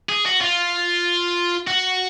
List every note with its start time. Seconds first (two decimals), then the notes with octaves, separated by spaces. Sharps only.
0.09 G#4
0.26 F#4
0.41 F4
1.67 F#4